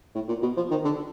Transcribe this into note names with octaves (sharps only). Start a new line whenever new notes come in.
A2
A#2
B2
F3
D#3
D3